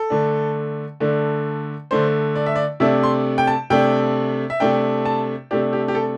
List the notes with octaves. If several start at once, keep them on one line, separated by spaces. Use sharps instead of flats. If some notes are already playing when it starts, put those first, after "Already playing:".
Already playing: A4
D3 A3 D4
D3 A3 D4
D3 A3 D4 C5
D5
E5
D5
C3 A3 D4 E5
C6
G5
A5
C3 A3 D4 G5
E5
C3 A3 D4 G5
A5
C3 A3 D4 G4
G4
G4
A4